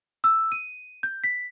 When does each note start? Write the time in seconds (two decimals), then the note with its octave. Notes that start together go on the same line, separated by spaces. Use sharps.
0.24 E6
0.52 D#7
1.03 G6
1.24 B6